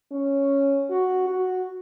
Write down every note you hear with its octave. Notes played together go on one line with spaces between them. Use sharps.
C#4
F#4
F#4